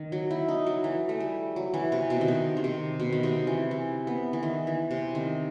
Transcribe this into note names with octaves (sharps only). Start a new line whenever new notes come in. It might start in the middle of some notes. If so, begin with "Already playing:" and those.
Already playing: D#3
F#3
E4
D#4
F#3
E3
A3
G3
F#3
E3
C3
B2
D#3
C3
D#3
C3
B2
D#3
C3
E3
E3
B3
E3
D#3
E3
C3
D#3